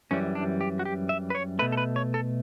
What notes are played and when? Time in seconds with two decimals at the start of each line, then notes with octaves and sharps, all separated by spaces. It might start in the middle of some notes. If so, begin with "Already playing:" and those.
0.11 F#2 E3 G3 C#4
0.35 D4
0.61 G4
0.79 F#4
0.85 G4
1.09 E5
1.30 B4
1.35 C#5
1.59 A3 B4
1.62 B2
1.72 A4
1.77 B4
1.96 C#5
2.14 A4